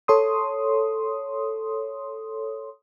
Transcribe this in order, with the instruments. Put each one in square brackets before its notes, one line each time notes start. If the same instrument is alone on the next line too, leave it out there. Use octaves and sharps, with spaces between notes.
[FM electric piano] A4 C#5 C6 D#6